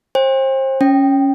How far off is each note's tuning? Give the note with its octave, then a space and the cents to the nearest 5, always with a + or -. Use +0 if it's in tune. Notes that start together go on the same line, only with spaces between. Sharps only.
C5 +30 G5 +35
C#4 +0 G5 +0